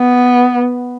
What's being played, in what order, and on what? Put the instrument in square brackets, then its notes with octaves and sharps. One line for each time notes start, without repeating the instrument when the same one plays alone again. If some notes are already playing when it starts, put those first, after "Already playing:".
Already playing: [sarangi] B3